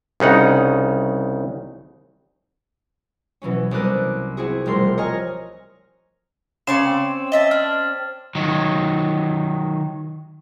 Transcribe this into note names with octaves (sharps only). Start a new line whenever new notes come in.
C2 C#3 D#4 F#5
B2 E3 F#3 C#4
C2 B3 A#4 D6 F#6 D#7
C4 E4 F#4 G#4
E1 F3 G3 A3 A#4 C6
C#5 D#5 G#5 A#5 F6
C#3 C#5 D5 C6 E7
C4
D#5 E5 A5
D4 F6
D#3 F#3